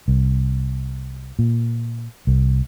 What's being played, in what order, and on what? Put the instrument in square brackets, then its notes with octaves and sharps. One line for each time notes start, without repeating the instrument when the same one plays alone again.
[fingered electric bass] C2
A#2
C2